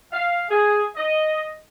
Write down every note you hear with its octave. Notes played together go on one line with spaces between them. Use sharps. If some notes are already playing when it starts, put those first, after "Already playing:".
F5
G#4
D#5